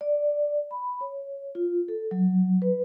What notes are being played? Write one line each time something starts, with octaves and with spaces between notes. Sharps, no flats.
D5
B5
C#5
F4
A4
F#3
B4